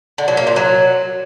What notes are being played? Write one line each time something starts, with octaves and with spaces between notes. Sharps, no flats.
D3
F#3
A#3
A#2
F#3